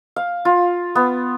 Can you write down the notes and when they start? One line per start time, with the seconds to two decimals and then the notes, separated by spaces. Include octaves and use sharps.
0.16 F5
0.45 F4
0.95 B3